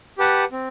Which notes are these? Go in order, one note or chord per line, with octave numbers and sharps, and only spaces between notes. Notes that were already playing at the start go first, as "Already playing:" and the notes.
G4 B4 F#5 A5
C4